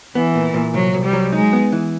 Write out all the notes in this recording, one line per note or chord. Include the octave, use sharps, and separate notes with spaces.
E3 B3
A#2
A#2
C2 F#3
C2
G3
F#3
G#3 D#4
B3
E3